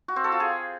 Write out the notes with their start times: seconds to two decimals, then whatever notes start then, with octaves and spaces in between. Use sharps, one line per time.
0.08 F#4
0.16 C4
0.24 A4
0.32 F4
0.40 G#4